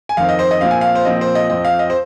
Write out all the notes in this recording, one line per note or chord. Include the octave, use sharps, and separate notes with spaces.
G#5
F2 D#3 C4 F5
D#5
C5
D#5
A#2 F3 C4 F5
G#5
F5
C5
A#2 F3 C4 D#5
C5
D#5
F2 F3 C4 D#5
F5
D#5
C5